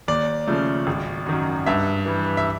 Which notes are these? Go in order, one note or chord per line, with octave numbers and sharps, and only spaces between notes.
D#2 D5
C#3 F3 A3
G#1
F#2 D#3
G2 E5
E3 G3
E5